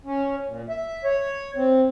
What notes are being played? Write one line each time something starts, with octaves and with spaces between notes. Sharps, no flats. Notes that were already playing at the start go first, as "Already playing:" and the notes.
C#4
A#2
E5
C#5
C4